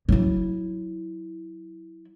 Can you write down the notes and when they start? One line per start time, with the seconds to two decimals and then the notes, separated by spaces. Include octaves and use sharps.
0.09 F#3 E4